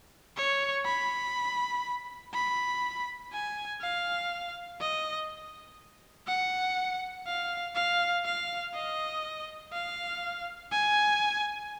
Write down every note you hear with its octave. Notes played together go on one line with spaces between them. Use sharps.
C#5
B5
B5
G#5
F5
D#5
F#5
F5
F5
F5
D#5
F5
G#5